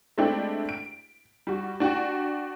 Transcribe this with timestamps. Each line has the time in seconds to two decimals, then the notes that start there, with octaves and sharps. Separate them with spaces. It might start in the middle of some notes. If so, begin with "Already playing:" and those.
0.18 G#3 A3 C4 D4 E4 G4
0.69 D7
1.47 G3 F#4
1.80 D4 F#4 G4